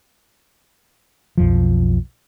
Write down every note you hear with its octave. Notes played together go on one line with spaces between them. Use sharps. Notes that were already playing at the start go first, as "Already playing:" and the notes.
B1 F2 F3